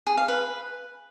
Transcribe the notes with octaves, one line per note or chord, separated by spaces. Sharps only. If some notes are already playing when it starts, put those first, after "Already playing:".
G#4
F5
B4